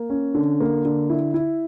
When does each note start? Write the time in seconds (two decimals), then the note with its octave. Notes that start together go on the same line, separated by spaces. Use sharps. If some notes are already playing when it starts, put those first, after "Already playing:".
Already playing: A#3
0.10 C#4
0.34 D3
0.60 A#3
0.85 D3
1.10 E4
1.34 E4